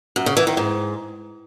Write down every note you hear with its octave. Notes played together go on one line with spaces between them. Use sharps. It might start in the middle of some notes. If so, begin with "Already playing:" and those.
F#2
C#3
E3
D#3
G#2